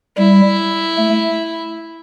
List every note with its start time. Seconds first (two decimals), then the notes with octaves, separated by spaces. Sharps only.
0.17 G3 E4
0.98 A3